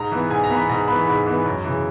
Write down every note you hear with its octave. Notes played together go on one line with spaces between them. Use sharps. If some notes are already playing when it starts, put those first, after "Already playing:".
Already playing: G#2 A#5
E3 B3
G#2 G#5
A#5
E3 B3
B5
G#2 A#5
E3 B3 B5
G#2 B5
E3 B3
F#2
C#3 E3